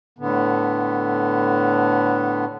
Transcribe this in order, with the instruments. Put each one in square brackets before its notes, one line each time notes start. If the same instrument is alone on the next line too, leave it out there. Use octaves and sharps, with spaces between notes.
[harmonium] A2 D3 B3